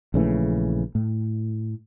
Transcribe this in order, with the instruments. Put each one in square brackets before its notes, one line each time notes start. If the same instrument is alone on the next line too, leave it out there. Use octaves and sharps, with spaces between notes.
[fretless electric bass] A#1 C#3 E3 A3
A2